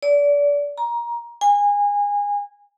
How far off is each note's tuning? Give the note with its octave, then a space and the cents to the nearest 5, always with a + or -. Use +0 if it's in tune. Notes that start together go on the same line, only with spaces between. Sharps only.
D5 -30
A#5 +20
G#5 -25